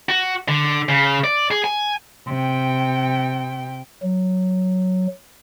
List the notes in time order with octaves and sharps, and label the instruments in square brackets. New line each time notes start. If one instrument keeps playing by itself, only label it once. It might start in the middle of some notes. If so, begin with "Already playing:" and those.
[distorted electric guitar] F#4
D3
C#3
D5
G#4
G#5
[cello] C3 G5
[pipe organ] F#3